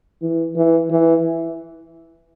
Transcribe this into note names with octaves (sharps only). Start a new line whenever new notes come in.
E3
E3
E3